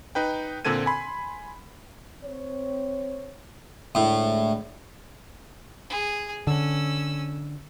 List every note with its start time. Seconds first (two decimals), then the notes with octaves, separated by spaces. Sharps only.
0.15 D#4 B4 G5
0.65 A#2 D3 C4 A4 G#6 D#7
0.86 G#5 B5 C6
2.23 C4 C#5
3.95 D2 A2 G#3 D4
5.90 G#4
6.47 D3 C#4 E6